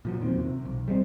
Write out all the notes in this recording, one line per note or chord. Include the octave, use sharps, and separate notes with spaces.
A#2 F3 F#3
E2 D#3 C4
C3
B1
G3 G#3 B3 C4